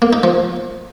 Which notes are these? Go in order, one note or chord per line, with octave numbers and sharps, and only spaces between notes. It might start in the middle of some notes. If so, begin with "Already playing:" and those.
A#3
D#4
F3